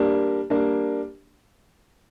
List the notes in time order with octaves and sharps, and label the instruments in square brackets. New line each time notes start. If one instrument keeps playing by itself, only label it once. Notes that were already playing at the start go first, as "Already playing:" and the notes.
Already playing: [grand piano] G3 A#3 D4
G3 A#3 D4